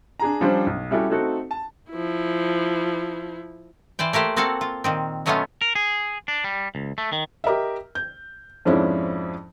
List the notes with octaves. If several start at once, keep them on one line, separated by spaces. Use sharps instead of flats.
D4 G#4 A#5
F3 G3 C#4 D4 C5
B1
G3 C#4 E4 F#4 G4 A4
A3 C4 D#4 F#4 A4
A5
F3 E4
E3 C5 D5 G5
A3 A#3 G4 C5 D5
A#3 C4 F#4 A4 F5
F4
A#2 D#3 C4
B2 F#3 A3 B3 C#4 F4
A#4
G#4
D4
G3
C#2
A3
D#3
G4 A#4 D#5 E5
G6
F2 G#2 F3 C#4 D4 E4